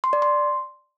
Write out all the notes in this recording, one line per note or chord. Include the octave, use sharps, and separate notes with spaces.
C6
D5
C6